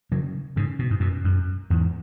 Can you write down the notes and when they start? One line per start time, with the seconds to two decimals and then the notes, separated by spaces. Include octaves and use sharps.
0.12 C#3 F#3
0.56 G#2 C#3
0.79 B2
0.90 G#2
1.00 F#2 B2
1.24 F#2
1.70 E2 G#2